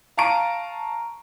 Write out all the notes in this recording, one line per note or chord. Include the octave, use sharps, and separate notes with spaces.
F5 A5 A#5 C#6 D7 D#7